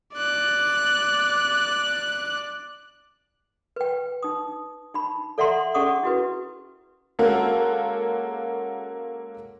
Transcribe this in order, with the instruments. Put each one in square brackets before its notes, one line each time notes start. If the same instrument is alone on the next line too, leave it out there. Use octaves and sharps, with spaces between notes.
[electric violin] D5 F#6
[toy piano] B4 G5
D#4 D#6
D#4 B5
A4 D5 E5 F#5 A#5 C6
C#4 G#4 D5 F#5 C#6 D#6
E4 F#4 B4
[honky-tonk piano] G#3 A#3 C#4 F#4 A4